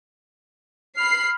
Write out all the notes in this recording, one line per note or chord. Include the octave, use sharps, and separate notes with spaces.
B5 F6 C7